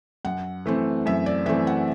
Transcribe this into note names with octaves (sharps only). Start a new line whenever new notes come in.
F#2 F#5
E3 A3 C4
F#2 E5
D5
E3 A3 C4 E5
F#5